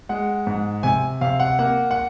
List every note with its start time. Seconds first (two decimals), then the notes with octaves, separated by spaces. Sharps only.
0.09 G#3 F#5
0.47 G#2
0.83 C3 G#5
1.21 C3 F5
1.40 F#5
1.59 A#3 F#5
1.91 F#5